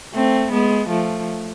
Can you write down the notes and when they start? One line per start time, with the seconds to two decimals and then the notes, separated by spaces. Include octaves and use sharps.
0.14 A3 C4
0.52 G#3 B3
0.89 F3 A3